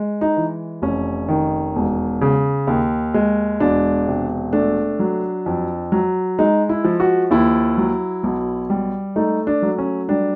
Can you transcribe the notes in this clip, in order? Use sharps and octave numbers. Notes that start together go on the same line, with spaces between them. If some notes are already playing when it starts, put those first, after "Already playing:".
Already playing: G#3
D#4
E3
F1 C#4
D#3
E1
C#3
D#2
G#3
E1 D4
C3
A3 D4
F#3
F2
F#3
G#3 D#4
E4
F3
F#4
D#2 E4
F#3
B1
G3
A3 D#4
D4
F#3
C#4
G3 D4